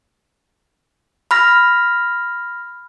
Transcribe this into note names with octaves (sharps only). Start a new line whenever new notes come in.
B5 F6 A#6